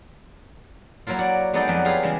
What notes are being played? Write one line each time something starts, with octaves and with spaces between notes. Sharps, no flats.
F#3 A#3 E4 F4
F#4 D5 F#5
G#3 B3 D#4 A4 D5 G5
F2 F#3 B3 B4
E4 F4 G4 G#4 B4 F5
C#3 E3 G3 G#3